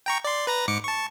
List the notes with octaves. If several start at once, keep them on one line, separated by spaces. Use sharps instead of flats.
G5 A#5 C#6
D5 C6
B4 A#5 A#6
G#2 D6 C#7
A5 C#6